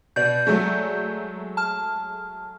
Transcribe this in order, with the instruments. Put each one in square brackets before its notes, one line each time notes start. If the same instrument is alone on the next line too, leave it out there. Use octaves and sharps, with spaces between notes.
[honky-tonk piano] B2 [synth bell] D5 G6
[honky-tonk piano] F#3 G#3 A3
[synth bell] A5 F6